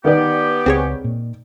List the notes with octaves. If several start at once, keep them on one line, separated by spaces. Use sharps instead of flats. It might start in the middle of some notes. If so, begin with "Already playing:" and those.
D#3 B3 G4 B4 D5
C#2 C4 G#4 C#5
A#2